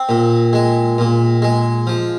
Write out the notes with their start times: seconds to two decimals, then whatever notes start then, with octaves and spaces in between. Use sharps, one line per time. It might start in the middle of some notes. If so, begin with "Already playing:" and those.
Already playing: C4
0.09 A#2
0.53 G#3
0.98 A#2
1.42 G#3
1.87 F3